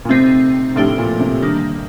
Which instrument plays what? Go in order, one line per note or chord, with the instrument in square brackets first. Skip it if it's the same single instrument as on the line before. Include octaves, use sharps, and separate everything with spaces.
[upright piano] A#2
[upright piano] C3 [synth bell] A3 C4 D#4
[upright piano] A2 [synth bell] F3 A3 D4 G4
[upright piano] A#2
C3
[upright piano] D3 [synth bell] D#3 G3 A#3